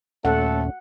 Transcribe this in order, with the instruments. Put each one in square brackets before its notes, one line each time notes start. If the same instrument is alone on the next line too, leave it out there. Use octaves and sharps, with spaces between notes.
[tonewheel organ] D#2 A#2 C#4 [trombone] A3 [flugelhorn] A4 [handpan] F#5